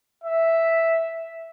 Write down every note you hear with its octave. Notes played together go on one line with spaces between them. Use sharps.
E5